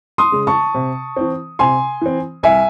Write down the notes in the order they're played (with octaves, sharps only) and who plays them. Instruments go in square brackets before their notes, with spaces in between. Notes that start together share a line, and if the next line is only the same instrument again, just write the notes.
[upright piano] C6 D#6
C#3 G#3
A5 C#6
C3
E3 C4
C3 G#5 C6
E3 C4
C2 E5 G#5